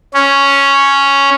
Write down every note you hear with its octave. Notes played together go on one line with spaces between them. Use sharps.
C#4